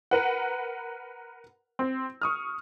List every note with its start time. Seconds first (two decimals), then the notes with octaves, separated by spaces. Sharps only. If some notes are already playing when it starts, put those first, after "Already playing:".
0.11 A#4 B4 F#5
1.79 C4
2.22 C#6 D#6 F6